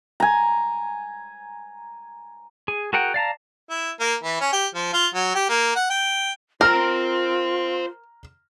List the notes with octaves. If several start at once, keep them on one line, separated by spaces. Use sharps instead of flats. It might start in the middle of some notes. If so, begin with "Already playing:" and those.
G#5 A#5
G#4
F#4 G#4 A#4 F#5 G5
D5 F5 A5 A#5
E4
A#3
E3
C#4
G4
F3
F4
F#3
G4
A#3
F#5
G5
F4 A#4 C5 G5 A#5 F6